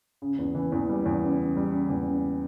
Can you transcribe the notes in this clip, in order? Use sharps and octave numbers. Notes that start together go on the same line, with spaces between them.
C#3
E2
E3
E2
G3
E2
C#3
C#3
G3
C#3
E2
C#3